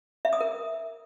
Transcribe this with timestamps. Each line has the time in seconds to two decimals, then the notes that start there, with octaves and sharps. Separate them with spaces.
0.25 E5
0.33 D#6
0.41 A#4